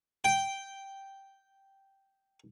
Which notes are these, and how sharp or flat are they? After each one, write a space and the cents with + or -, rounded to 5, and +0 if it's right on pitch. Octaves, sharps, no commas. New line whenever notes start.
G5 -5